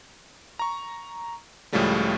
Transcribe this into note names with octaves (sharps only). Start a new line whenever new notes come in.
A#5 C#6
C#2 A2 C#3 F3 G3 A3